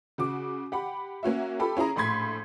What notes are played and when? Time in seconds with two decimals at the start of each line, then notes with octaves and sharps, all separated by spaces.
0.18 C#3 F#4 D6
0.72 G4 F#5 B5
1.23 A#3 C#4 F#4 E5
1.59 F4 G4 A4 B5
1.77 C#4 E4 G#4 A#5
1.96 A#1 A2 B5 C6 G#6 B6